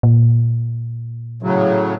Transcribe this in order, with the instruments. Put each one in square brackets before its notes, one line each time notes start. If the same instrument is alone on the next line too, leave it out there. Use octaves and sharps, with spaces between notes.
[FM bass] A#2
[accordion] A2 C#3 F#3